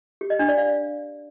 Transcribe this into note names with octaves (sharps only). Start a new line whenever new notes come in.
G4
D#5
D4
D5
F5